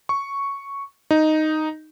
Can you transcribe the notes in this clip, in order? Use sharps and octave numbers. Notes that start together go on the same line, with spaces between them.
C#6
D#4